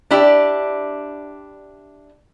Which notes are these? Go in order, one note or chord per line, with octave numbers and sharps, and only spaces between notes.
D4 E4 G4 D5